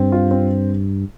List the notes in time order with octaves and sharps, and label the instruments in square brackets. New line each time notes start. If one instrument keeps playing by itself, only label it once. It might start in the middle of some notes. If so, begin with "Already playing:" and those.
Already playing: [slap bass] G2 [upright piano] C4
[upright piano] F4
C4